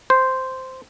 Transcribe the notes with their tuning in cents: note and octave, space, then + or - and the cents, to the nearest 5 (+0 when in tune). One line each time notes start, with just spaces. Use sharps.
C5 -5